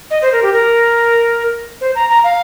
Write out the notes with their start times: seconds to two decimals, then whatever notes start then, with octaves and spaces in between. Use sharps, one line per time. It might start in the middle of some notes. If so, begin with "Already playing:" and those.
0.11 D#5
0.22 C5
0.32 A#4
0.42 G4
0.53 A#4
1.81 C5
1.95 A#5
2.10 A#5
2.24 F5